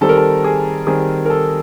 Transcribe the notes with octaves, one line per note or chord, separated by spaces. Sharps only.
D#3 G3 C4 A4
A#4
A4
G#4
D#3 G3 C4 G#4
A#4
A4